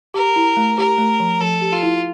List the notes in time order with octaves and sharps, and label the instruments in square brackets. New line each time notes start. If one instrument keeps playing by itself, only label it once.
[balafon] G4 [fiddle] A#4
[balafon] E4
A3
[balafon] G4 [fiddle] A#4
[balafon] A3
F3
[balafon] F3 [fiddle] A4
[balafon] G4
[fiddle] F4
[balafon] E4